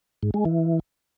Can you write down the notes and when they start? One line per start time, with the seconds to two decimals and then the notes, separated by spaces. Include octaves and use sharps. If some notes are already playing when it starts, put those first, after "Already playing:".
0.23 G#2
0.34 G#3
0.45 E3